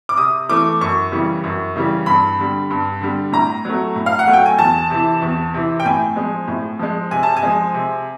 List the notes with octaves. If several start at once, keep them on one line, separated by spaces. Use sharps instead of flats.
D6
C3 D#6
E3 A3 D6
F#2 C#6
C#3 E3 G3
F#2
C#3 E3 G3
G2 B5
D3 G3
G2
D3 G3
A2 A#5
F#3 A3
A2
F5
F#5
F#3 A3
G5
G#5
E2 A5
C3 E3
E2
C3 E3
G5
A2 G#5
F3 G#3
A2
F3 G#3
C3 G#5
A5
G#5
F3 G#3
C3